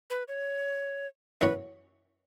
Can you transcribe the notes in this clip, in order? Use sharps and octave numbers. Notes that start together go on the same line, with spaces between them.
B4
C#5
F#2 E3 C#4 F#4 B4 C#5